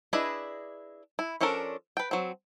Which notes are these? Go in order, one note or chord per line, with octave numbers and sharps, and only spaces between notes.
D4 E4 G#4 B4 D#5
E4
F3 C#4 D4 A4 A#4
B4 G5
F#3 C4